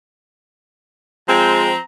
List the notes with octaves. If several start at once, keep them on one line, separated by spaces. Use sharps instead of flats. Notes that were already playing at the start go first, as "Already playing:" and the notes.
F3 G#3 C4 A#5